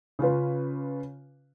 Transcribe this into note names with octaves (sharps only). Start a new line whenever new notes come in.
C#3 C#4 F4 B4